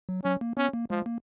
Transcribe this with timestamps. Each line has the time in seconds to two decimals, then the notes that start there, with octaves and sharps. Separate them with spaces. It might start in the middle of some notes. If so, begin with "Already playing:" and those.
0.09 F#3
0.24 F#3 C#4
0.41 A#3
0.57 B3 C#4
0.73 A#3
0.90 F3 G#3
1.06 A#3